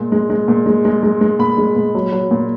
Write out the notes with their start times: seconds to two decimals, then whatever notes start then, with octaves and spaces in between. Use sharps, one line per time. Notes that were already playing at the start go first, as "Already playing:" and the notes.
Already playing: A#2 G#3
0.12 G#3
0.30 G#3
0.48 A#2
0.66 G#3
0.85 G#3
1.03 G#3
1.21 G#3
1.39 A#2 B5
1.58 G#3
1.76 A#2
1.95 F#3
2.12 F#3
2.31 A#2